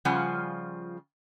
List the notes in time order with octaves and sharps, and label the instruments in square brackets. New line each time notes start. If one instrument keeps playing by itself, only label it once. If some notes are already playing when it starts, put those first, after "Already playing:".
[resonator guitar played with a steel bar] C#3 F3 G3 F4 F#5 G#5